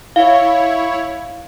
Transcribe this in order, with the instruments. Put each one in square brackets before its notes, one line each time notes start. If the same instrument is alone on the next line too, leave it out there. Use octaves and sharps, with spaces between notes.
[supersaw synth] E4 C#5 [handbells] F5